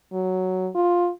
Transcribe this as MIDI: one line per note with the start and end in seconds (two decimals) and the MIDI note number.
0.13 0.69 54
0.75 1.10 65